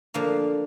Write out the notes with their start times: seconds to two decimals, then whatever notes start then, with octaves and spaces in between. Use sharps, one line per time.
0.14 D3 F3 A#3 F5